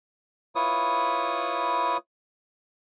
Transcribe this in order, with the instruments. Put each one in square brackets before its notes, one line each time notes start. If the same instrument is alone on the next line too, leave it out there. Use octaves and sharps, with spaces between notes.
[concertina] E4 F4 B4 C#5 D#6